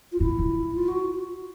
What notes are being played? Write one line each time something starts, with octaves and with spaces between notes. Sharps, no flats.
F4
A2 E4
A2
F4
F#4